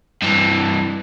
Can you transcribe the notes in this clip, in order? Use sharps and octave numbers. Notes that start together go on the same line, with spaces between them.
G2 E3